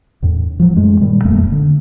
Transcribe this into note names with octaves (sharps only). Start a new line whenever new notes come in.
E2 A2
F3 F#3
F#2 G#3 A3
G2 A#2 D#3 G3
E1 F2 A3 A#3
D3